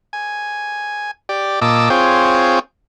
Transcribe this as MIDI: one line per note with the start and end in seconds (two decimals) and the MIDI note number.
0.13 1.11 80
1.29 1.60 67
1.29 1.60 74
1.62 1.89 46
1.62 1.89 75
1.62 1.89 81
1.62 1.89 86
1.62 1.89 88
1.90 2.59 60
1.90 2.59 65
1.90 2.59 68
1.90 2.59 73
1.90 2.59 79